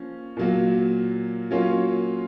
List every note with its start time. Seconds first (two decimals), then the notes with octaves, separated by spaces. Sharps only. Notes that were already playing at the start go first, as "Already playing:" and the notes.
Already playing: F3 A#3 C#4
0.37 A#2 F#3 A#3
1.51 F#3 A#3 C#4 F4